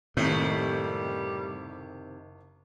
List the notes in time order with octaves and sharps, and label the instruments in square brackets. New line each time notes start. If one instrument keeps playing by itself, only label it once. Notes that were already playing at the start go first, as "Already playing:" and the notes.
[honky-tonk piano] F#1 G6 [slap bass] A2 [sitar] C3 D#3 E4 [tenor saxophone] G3